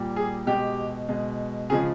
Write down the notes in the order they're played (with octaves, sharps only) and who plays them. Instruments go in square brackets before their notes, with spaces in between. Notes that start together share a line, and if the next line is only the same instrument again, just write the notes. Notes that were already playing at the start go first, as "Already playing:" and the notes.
Already playing: [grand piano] A#2 G3
G#4
B2 G#3 G4
B2 G#3
C#3 F3 G#3 G#4